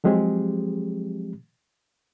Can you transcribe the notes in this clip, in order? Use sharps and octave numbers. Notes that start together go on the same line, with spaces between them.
F3 F#3 G#3 C4 G4 G#4